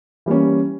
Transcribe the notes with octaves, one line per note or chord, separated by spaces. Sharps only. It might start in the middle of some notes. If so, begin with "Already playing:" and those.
E3 G3 A#3 C#4